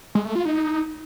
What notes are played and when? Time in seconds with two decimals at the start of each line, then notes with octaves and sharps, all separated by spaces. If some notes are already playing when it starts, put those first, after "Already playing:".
0.15 G#3
0.25 A3
0.35 F4
0.45 D#4